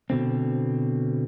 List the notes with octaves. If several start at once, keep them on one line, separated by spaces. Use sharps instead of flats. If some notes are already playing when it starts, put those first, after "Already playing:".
B2 D3 C4